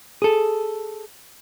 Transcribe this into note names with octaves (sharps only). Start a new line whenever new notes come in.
G#4 A4